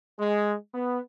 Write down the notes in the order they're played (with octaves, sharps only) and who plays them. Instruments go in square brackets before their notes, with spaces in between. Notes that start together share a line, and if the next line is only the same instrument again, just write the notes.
[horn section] G#3
B3